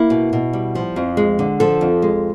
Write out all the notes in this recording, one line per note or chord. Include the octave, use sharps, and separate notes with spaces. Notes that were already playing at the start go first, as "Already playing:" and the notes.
Already playing: A#3 E4
B2
B2
G3
F3
F2
G#3
D3
F3 A4
F2
G#3